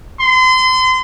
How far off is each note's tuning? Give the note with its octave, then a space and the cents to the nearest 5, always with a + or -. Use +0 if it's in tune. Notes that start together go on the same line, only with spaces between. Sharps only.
C6 -35